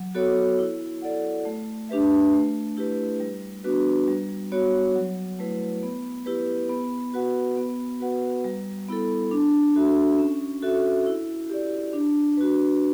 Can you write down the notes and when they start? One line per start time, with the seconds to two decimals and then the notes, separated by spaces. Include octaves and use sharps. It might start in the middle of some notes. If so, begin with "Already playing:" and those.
Already playing: F#3
0.15 B3 F#4 A4 C#5
0.59 E4
1.02 A4 D5 F#5
1.45 A3
1.89 D4 G4 B4 E5
2.33 A3
2.77 E4 G4 B4
3.20 G3
3.64 B3 D4 F#4 B4
4.08 G3
4.52 B3 F#4 C#5
4.95 F#3
5.39 A3 E4 B4
5.83 B3
6.26 E4 G4 B4
6.69 B3
7.14 F#4 B4 F#5
7.57 B3
8.00 F#4 B4 F#5
8.44 G3
8.88 B3 E4 A4
9.32 D4
9.75 F#4 A4 E5
10.19 C#4
10.62 F#4 A4 E5
11.06 E4
11.50 G4 D5
11.93 D4
12.37 F#4 B4